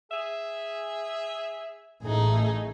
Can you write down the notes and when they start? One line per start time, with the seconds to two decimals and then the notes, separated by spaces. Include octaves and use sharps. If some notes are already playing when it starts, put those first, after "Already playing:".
0.12 G#4 E5
2.02 A1 A3 D#4 G#4